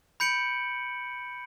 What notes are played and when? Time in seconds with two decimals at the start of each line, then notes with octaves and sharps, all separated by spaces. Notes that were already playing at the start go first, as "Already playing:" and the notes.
0.20 B5 G6 C#7 D7 F#7